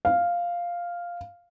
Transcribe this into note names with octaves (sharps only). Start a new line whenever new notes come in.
F5